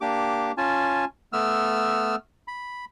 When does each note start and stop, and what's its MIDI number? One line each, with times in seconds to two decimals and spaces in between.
0.01 0.52 58
0.01 0.52 62
0.01 0.52 67
0.01 0.52 86
0.57 1.05 61
0.57 1.05 65
0.57 1.05 80
0.57 1.05 81
1.33 2.16 57
1.33 2.16 59
1.33 2.16 88
1.33 2.16 89
2.48 2.85 83